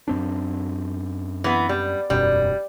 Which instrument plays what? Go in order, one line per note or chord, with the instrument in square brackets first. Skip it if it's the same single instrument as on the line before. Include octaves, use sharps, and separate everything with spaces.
[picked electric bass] F#2 C4 D4
[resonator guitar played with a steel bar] E3 B3
G3
[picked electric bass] E1 F#2 B2 [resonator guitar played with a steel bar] G3